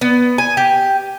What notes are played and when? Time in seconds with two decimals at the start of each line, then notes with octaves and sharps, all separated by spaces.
0.01 B3
0.38 G#5
0.57 G4